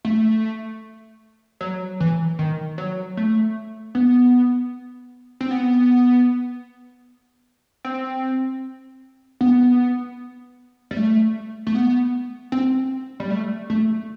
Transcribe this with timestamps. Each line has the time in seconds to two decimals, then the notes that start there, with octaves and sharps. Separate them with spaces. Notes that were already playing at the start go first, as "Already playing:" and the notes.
0.05 A3
1.61 F#3
2.00 E3
2.39 D#3
2.78 F#3
3.17 A3
3.95 B3
5.41 C4
5.51 B3
7.85 C4
9.41 B3
10.91 G3
10.97 A3
11.67 A3
11.75 B3
12.52 C4
13.20 G3
13.30 A3
13.70 A3